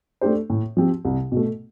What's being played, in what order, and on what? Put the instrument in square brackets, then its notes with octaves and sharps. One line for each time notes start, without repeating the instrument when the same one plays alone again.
[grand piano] A3 D4 G4 C5
A2
F3 C4 G4
C2
B2
A3